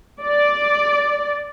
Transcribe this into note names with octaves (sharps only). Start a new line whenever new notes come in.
D5